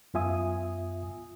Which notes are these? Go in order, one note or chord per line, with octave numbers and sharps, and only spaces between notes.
F#2 B3 F4 E5 G#5 D#6